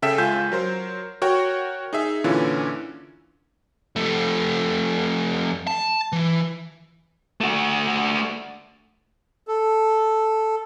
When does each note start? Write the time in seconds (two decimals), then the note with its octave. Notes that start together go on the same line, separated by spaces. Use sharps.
0.02 C#3 A4 E5 G5 B6 E7
0.18 C#2 F4 G#5 G6
0.52 F#3 A#4 C5
1.22 F#4 A#4 C#5 F#5 G5
1.93 D#4 G#4 E5
2.24 A#2 D3 E3 C#4 E4 F4
3.96 F2 A3
5.67 A5
6.12 E3
7.41 A3 F#4
9.48 A4